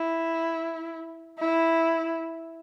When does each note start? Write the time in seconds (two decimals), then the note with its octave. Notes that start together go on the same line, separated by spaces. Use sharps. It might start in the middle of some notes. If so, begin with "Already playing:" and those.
Already playing: E4
1.39 E4